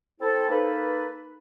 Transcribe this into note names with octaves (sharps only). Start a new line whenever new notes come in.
C4 E4 A4
A#3 D#4 A4 B4